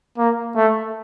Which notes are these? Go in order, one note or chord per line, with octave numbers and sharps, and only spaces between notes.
A#3
A3